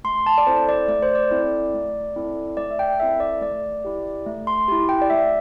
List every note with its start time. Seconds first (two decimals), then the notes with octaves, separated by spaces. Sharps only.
0.04 A3 C6
0.26 A5
0.38 D5
0.47 C4 E4 A4 C5
0.69 D5
0.88 A3 D5
1.02 C5
1.15 D5
1.31 C4 E4 A4
1.74 A3
2.16 C4 E4 A4
2.57 A3 D5
2.71 E5
2.79 G5
3.00 C4 E4 A4 E5
3.20 D5
3.42 A3 D5
3.85 E4 G4
4.26 A3
4.47 C6
4.68 E4 G4
4.89 G5
5.02 D5
5.10 A3 E5